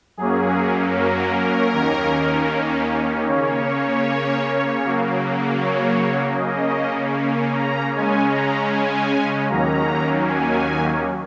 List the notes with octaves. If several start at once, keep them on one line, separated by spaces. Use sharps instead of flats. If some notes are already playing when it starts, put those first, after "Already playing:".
F#2 F#3 A#3 C#4 G#4
A#4
D#2 D#3 A#3 C#4
C#3 A#3 C#4 C#5
C#3 F#3 A#3
C#5
C#3 A#3 C#4 D#5
A#5
C#3 G#3 C#4 G#5
A#5
G#5
D#2 D#3 F#3 A#3 C#4 A#5
G#5